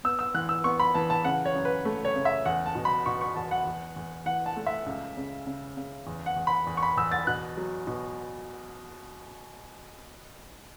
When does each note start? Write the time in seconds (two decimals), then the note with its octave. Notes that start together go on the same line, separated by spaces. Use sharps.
0.04 B3 E6
0.19 E6
0.34 E3 F#6
0.49 E6
0.64 B3 C#6
0.80 B5
0.95 E3 A5
1.10 A5
1.25 C#3 F#5
1.45 C#5
1.55 F#2
1.65 B4
1.85 A3
2.05 C#5
2.16 C#3
2.25 E5
2.46 E2 F#5
2.66 A5
2.75 B2
2.85 B5
3.06 B2 C#6
3.21 C#6
3.35 E2 A5
3.51 F#5
3.65 E2
3.96 E2
4.26 E3 F#5
4.46 A5
4.57 A3
4.67 E5
4.86 C#2
5.17 C#3
5.47 C#3
5.77 C#3
6.07 E2
6.26 F#5
6.37 E2
6.47 B5
6.67 E2
6.77 C#6
6.83 B5
6.97 E2 E6
7.12 A6
7.27 B2 F#6
7.57 F#3
7.87 B2